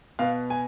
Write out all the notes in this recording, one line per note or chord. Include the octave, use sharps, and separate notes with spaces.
B2 B3 F5
G#5